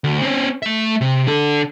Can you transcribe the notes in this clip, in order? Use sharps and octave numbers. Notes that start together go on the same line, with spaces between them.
D2
C4 C#4
A3 E5
C3
D3 A4